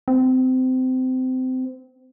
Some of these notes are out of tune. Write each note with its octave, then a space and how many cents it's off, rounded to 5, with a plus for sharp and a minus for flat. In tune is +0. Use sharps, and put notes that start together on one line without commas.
C4 -25